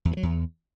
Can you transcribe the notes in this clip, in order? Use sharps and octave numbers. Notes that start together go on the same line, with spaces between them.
E2
G2
F#3
E2